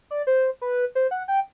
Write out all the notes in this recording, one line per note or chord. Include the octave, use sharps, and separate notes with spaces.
D5
C5
B4
C5
F#5
G5